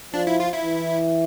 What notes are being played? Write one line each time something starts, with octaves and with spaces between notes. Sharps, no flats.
F3 D4
E4
F4
E4
E3